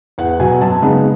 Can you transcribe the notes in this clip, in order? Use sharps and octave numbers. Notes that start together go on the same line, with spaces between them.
E2 F#5
B2 F#3 G#5
F#2 A5
C#3 G#3 B3 D#4 F#5